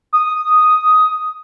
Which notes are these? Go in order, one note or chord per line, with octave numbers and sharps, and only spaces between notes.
D#6